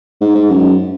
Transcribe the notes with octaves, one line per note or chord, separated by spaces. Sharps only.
G#2
G#2
F#2